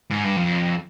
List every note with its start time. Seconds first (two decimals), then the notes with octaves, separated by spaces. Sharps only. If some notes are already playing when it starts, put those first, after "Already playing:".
0.11 G#2
0.25 G2
0.37 F2